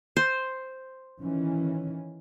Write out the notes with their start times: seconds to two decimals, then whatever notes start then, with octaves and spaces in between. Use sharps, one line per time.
0.17 C5
1.21 D#3 E3 C#4